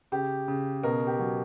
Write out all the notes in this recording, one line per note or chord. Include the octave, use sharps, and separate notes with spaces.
C#3 G4
C#3
B2 A#4
G4
F#3